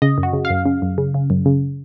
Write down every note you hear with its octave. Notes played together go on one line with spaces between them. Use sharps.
C#3 D#5
F#2
F#4
C#3
F5
F#2
C#3
F#2
C#3
C#3
F#2
C#3